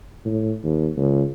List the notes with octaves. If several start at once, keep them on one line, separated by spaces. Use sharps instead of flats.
A2
D#2
C#2